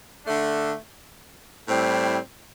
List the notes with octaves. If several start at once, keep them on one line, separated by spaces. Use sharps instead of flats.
D3 A3 D4
A2 G3 C4 E4